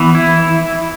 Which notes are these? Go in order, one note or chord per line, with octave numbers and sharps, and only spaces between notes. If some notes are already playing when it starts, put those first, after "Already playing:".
Already playing: E3 B3
E4